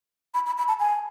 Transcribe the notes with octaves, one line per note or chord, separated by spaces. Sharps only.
B5
B5
B5
A5
G#5